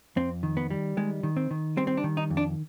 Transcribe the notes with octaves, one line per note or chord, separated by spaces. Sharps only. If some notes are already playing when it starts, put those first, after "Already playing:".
F2 C4
D#3
B3
G3
D#3 G#3
D#3
C4
D#3
G3 C4
C4
D4
D#3
D#4
F2
D4